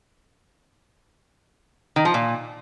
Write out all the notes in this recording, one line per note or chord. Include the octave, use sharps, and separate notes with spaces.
D#3
F3
A#2